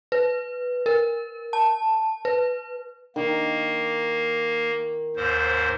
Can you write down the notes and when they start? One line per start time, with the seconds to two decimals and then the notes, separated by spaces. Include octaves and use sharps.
0.12 B4
0.86 A#4
1.53 A5
2.25 B4
3.16 D#3 A#3
5.16 D#2 G#2 C5